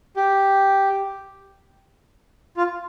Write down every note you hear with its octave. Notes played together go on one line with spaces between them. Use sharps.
G4
F4